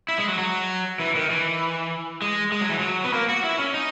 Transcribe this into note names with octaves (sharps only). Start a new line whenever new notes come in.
E4
G#3
F#3
F#3
E3
D#3
E3
G#3
G#3
F#3
E3
F#3
B3
A#3
F#4
E4
C#4
D#4